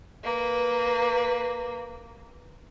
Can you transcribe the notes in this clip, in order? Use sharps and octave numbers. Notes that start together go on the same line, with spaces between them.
A#3 B4